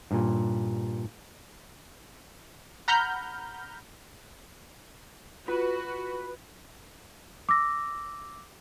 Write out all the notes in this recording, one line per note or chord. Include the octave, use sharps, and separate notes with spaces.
G2 A#2
F#5 A#5 B5 F6 G6
F4 F#4 B4
D6 E6 A#6